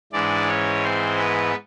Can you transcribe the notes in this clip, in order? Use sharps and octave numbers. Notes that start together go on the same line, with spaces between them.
G#2 E3 G#3 D4 D5
C#4 C#5
C4 C5
B3 B4